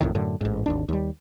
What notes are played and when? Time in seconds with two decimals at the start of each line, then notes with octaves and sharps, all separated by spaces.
0.01 A1 F2 A2 D#3
0.15 F#2 A2 D3
0.41 A1 G#2
0.66 G#1 D#2 D4
0.89 D#2 G3